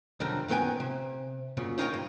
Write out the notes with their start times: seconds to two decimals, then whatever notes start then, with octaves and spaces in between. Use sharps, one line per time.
0.20 B1 F2 D3 G3 A#4
0.48 F#2 D#3 B3 A4 G5 G#5
0.80 C3
1.57 F#2 A#2 C#3
1.78 D#2 D#4 F4 A#4 C#5 G5
1.94 G2